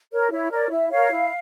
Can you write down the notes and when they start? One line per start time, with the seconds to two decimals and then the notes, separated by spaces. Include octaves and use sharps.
0.12 A#4 C#5
0.31 E4 C#5
0.51 A#4 C#5 D5
0.70 E4 E5
0.90 A#4 C#5 F5
1.10 E4